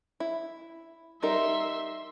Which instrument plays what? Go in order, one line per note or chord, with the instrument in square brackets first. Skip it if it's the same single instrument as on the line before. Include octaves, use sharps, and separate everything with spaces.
[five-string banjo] E4
[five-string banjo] G3 D#4 A#4 [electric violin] E5 C6